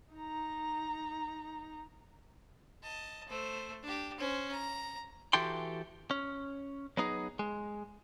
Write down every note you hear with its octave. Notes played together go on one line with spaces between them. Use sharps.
D#4 A#5
D#5 A5
A3 C5
D4 G4
C#4 C5
A#5
E3 F#4 G4 A4 G5 C6
C#4
F#3 B3 D#4 G#4
G#3